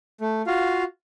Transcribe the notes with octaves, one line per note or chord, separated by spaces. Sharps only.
A3
F4 F#4 F5